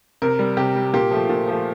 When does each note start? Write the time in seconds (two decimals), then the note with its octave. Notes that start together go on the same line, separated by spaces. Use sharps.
0.22 C3 A#4
0.39 G3
0.57 C3 G4
0.75 G3
0.93 A#2 G4
1.11 F3 A3
1.29 A#2
1.48 F3 A3